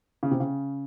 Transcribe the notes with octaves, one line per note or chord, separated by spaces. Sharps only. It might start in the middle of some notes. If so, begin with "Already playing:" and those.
C#3
C3
C#3